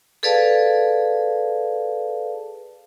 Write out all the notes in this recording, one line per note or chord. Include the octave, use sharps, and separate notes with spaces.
G#4 A4 B4 D5 F5 A5